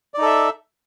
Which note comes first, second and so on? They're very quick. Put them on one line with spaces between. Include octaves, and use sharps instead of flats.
D5 D#4 A4 E5